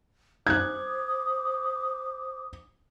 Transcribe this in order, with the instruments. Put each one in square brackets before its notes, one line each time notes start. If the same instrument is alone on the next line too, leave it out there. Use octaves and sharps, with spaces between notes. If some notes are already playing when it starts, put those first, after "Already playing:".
[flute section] C5 D6 D#6 [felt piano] F#6 G#6